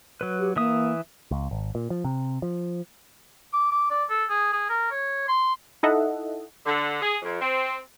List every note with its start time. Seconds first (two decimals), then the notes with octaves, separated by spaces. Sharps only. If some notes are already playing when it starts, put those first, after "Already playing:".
0.21 F#3 B4
0.39 G4
0.56 E3 A#3 E5 D#6
1.31 C#2
1.51 G#1
1.75 A#2
1.90 F3
2.05 C3
2.42 F3
3.53 D6
3.71 D6
3.90 D5
4.09 A4
4.29 G#4
4.53 G#4
4.70 A#4
4.91 C#5
5.28 C6
5.83 D#4 E4 A4 D#5 E5 F#5
6.66 D3
7.01 G#4
7.22 F2
7.40 C4